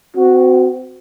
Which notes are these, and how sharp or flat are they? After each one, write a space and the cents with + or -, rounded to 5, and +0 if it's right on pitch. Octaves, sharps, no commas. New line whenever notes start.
C4 -30 F#4 +0